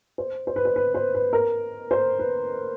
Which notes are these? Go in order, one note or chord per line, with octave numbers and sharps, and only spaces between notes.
C5
C5
B4
C5
B4
C5
B4
A#4
C5
B4